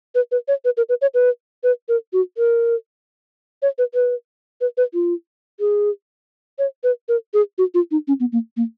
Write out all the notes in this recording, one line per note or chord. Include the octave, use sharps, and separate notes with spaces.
B4
B4
C#5
B4
A#4
B4
C#5
B4
B4
A#4
F#4
A#4
C#5
B4
B4
B4
B4
F4
G#4
C#5
B4
A#4
G#4
F#4
F4
D#4
C#4
B3
A#3
A#3